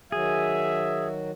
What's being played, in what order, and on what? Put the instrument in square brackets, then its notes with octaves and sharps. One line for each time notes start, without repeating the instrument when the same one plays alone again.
[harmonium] D#3 F#3 F#4 [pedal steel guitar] G#4 [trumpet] E5